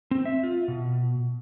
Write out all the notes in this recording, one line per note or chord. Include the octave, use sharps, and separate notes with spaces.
C4
E5
F4
B2